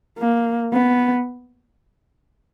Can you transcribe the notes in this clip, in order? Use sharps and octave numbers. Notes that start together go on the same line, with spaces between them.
A#3
B3